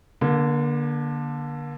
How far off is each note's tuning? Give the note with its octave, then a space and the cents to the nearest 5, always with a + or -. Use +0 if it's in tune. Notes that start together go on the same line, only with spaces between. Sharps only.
D3 +0 A#3 +35